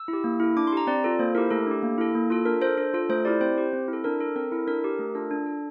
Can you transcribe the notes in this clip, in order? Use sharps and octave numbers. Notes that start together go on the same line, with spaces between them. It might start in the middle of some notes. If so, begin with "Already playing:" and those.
Already playing: E6
E4
G4
A#3
E4 A4
D4 D6
C6
G4 A#5
C4 D5
F4 A4
A#3 C5
E4 G4 A#4
A3 A4
D4 G4
A#3
E4 A4
A#3
F4 A4
D4 A#4
A4 C5
D4 A4
F4 A4
A3 C5
E4 G4 D5
C4 C5
G4
C4
E4
A4
D4 A#4
A4
C4 A#4
E4 A4
D4 A#4
G4
A3
D4 F4 A4
D4
A4